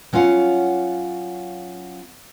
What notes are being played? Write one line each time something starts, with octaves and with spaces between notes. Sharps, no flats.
F#3 C#4 F4 F5 F#5